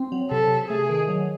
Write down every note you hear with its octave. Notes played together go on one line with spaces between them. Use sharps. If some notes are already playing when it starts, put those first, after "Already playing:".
Already playing: C4
F#3
C3 A4
C3
A3 G#4
D#3
F#3